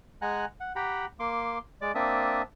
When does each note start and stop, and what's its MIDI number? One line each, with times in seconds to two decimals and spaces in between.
0.22 0.45 56
0.22 0.45 78
0.22 0.45 80
0.22 0.45 82
0.22 0.45 90
0.61 0.73 78
0.76 1.06 67
0.76 1.06 78
0.76 1.06 79
0.76 1.06 82
0.76 1.06 83
1.20 1.58 58
1.20 1.58 84
1.20 1.58 86
1.82 1.92 56
1.82 1.92 74
1.82 1.92 86
1.95 2.42 58
1.95 2.42 60
1.95 2.42 62
1.95 2.42 76
1.95 2.42 81
1.95 2.42 87